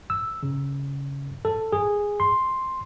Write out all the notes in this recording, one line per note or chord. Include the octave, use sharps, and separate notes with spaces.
E6
C#3
A4
G#4
C6